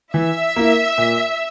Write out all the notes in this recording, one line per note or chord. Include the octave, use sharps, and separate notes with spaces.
E3 E5
A#3 E4
A#2